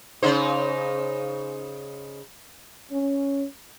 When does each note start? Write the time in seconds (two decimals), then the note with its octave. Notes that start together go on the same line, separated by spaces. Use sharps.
0.23 C#3 D#4 C5
2.90 C#4